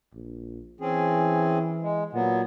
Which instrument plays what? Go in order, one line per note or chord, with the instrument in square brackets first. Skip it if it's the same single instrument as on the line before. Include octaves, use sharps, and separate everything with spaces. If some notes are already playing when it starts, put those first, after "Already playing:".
[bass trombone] A#1
[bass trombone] E3 [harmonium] C4 C#4 G#4
[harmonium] G#3
[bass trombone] A#2 [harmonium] F#3 B3